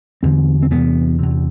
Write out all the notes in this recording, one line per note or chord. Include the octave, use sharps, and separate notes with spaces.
E2 D3 C4
C4
E2 C3 B3
E2 C3